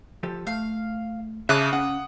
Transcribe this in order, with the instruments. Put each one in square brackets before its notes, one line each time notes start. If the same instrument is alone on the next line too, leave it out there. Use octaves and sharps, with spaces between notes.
[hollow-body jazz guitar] F3 G4 A4
[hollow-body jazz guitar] A3 [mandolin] F5
[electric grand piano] C#3 [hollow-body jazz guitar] E5 A5 [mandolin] D6 D#6 F#6
[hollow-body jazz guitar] C#4 F5 [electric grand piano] F#5